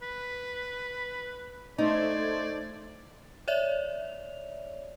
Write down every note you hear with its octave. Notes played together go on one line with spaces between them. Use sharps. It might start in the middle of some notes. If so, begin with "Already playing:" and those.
B4
A3 D#4 C5 D5 G#6
C#5 D5 E5 F7